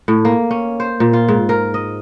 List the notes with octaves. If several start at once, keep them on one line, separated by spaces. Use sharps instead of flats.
A2
A#3
C#4
C5
A#2
F4
G#2
A#4
D#5